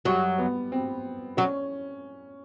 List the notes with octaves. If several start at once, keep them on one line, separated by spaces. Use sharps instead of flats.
F#2 F#3 G3
B3
C4
F#3 C#4